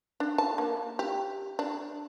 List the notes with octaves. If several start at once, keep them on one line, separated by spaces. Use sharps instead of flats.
D4
A5
A#3
G4
D4